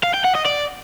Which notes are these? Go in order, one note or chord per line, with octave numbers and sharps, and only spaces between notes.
F5
G5
F#5
D#5
D5